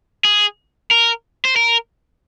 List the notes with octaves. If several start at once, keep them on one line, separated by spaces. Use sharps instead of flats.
G#4
A#4
C5
A#4